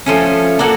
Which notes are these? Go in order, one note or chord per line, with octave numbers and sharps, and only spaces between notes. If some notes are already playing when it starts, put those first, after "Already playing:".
F3 A3 C#4
A#3 D4 F#4 A4